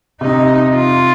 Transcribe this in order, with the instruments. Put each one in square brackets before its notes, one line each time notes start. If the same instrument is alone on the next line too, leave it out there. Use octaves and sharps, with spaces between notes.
[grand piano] C3 [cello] D#4
[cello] F4